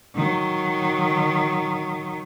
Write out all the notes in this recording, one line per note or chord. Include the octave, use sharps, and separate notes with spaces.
D#3 F#3